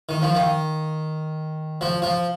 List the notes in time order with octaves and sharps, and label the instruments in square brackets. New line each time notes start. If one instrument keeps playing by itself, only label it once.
[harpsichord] D#3
F3
D#3
F3
F3